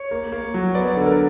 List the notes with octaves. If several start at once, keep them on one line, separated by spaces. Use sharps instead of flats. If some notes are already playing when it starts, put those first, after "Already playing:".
Already playing: C#5
A#3
A#3
F#3
B3 D5
D3
A#4